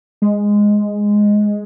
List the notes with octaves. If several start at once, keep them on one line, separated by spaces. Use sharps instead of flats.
G#3